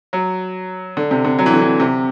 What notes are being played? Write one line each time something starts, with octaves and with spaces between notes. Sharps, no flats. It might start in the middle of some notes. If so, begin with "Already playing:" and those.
F#3
D3
C3
D3
F#3
E3
D3
E3
C3